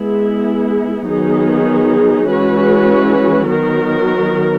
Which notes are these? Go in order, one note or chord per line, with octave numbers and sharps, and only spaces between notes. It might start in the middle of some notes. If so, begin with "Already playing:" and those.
Already playing: G#3 B3 E4 G#4
D#3 F#3 B3 D#4 G#4
E3 G#3 C#4 F#4 B4
D#3 F#3 B3 F#4 A#4